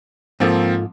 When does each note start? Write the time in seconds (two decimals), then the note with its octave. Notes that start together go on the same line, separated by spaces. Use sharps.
0.40 G#2 F3 A#3 C4 F4 A4